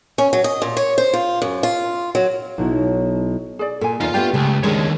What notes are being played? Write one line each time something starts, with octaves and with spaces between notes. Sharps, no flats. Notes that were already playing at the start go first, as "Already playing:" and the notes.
C#4
F#3
D#5
A#2
C#5
C5
F4
F#2
F4
F#3
B1 B2 E4 G#6
G#4 D5
A#2 A4 G#5
E2 C#3 D#4 F4 F5
A3 B3 D4 G4
C#2 A3
D2 D#3 G#3 C#4 C#5